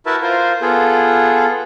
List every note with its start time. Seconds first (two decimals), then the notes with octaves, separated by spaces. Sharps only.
0.06 E4 F#4 A#4 B4 E5 A5
0.22 F4 A#4 C5
0.62 B3 F4 G#4 A4